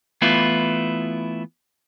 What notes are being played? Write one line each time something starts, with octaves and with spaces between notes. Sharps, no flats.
E3 A3 B3 E4 F4